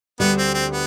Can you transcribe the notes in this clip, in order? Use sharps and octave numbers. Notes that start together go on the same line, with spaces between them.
D2 D3 G3 B3
C4
C4
B3